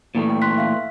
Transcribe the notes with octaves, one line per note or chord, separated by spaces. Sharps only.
A#2 E3 A3
G5
C6 F#6 B6
E5 F5 B6